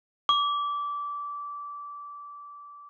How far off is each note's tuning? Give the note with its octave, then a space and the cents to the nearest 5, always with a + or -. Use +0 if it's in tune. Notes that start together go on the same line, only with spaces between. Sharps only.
D6 -20